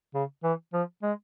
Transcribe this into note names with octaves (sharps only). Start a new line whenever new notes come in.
C#3
E3
F3
G#3